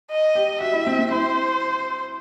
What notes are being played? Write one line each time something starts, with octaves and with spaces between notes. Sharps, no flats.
D#5
G4
F#4 E5
E4
C4
C4
E4 C5